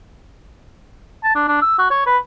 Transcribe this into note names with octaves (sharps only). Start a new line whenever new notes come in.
A5
D4
D4
E6
F#4
C#5
B4